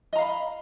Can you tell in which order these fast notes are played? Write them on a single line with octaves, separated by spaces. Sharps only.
D#5 A#5 F5 B5